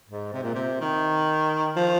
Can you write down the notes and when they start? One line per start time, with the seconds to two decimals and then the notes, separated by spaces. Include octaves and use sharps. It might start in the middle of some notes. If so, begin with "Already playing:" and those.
0.08 G#2
0.33 C3
0.43 A#2
0.54 C3
0.81 D#3
1.76 F3